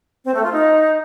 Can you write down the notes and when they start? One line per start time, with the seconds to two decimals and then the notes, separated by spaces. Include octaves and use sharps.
0.25 C4
0.34 A3
0.43 F4
0.52 D#4